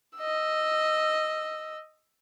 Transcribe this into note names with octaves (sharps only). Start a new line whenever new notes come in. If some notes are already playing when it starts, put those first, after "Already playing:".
D#5 E6